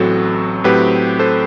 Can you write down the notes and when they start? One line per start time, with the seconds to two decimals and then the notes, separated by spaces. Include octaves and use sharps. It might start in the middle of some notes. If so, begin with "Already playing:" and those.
Already playing: A1 A2 F#3 C4 F#4 A4
0.64 A2 F#3 C4 G4 B4
1.19 A4 C5